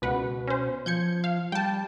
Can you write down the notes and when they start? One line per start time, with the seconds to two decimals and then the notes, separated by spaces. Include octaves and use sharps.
0.02 C#2 B2 B4 F#5
0.47 C#4 C5
0.86 F3 G6 G#6 C#7
1.24 F5
1.52 G3 G5 A5